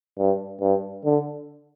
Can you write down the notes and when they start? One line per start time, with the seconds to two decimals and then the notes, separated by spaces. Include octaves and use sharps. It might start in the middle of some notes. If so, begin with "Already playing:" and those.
0.19 G2
0.61 G2
1.05 D3